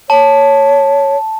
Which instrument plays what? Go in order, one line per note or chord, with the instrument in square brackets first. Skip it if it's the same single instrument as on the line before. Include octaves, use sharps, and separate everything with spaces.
[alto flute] C#5 [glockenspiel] A5